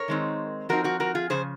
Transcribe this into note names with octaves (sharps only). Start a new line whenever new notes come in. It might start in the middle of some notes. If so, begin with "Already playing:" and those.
Already playing: A#4 C#5
D#3 G#3 C4 D#4
F3 C4 D#4 F#4 A#4
F#4 A#4
F#4 A#4
F4 G#4
C#3 F3 G#4 C5